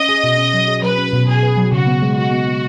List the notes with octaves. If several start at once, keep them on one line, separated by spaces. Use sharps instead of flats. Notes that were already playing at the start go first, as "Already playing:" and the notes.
Already playing: C#4 D#5
G#4
B2
C#4
F#3
G#4
F#3 B4
C#4
B2
B2 G#4
B4
F#3
C#3 F#4
B3
G#3
G#3 F#4
B3
B3